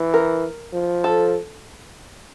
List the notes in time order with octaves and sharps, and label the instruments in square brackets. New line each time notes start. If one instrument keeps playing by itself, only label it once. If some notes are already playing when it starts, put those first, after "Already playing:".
Already playing: [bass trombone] E3
[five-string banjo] A#4
[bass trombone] F3
[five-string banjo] A4